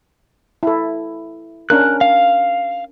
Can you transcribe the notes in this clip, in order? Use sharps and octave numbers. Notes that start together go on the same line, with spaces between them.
E4 A4
C#4 D4 A#4 F#6
F5